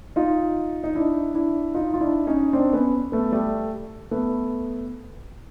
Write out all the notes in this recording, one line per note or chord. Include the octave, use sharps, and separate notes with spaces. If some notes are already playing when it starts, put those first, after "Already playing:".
D#4 F4
D#4
D4 E4
D4 E4
D#4 F4
F4
D4 E4
C#4 D#4
C4 D4
B3 C#4
A3 B3
G3 A3
A3 B3